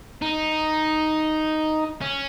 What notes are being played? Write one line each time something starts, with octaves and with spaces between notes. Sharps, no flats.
D#4
C#4